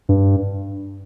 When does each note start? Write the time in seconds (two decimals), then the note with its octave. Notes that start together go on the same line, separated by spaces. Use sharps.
0.09 G2